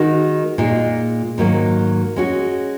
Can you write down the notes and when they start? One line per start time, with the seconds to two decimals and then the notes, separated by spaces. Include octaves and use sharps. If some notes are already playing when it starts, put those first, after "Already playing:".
Already playing: D#3 G#3 D#4 F#4
0.58 A#2 G#3 D#4
1.38 G#2 D#3 F#3 A#3
2.16 G#3 C#4 F#4